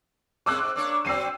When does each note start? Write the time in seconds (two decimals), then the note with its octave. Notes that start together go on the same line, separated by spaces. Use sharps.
0.46 G#3 A#3 C#4 D6 E6 F#6
0.58 G#2
0.76 A#3 D4 C#5
1.05 D3 F#3 C4 E6 C7 D#7